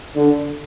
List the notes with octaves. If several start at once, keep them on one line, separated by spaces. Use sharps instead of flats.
D3